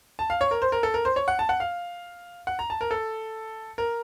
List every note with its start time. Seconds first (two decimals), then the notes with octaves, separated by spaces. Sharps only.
0.19 A5
0.30 F5
0.41 C#5
0.51 A#4
0.62 C5
0.72 A#4
0.83 A4
0.94 A#4
1.05 C5
1.16 C#5
1.28 F#5
1.39 A5
1.49 F#5
1.60 F5
2.47 F#5
2.59 A#5
2.70 A5
2.81 A#4
2.91 A4
3.78 A#4